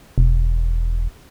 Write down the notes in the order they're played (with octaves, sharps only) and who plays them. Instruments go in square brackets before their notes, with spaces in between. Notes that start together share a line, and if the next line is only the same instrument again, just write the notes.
[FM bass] E1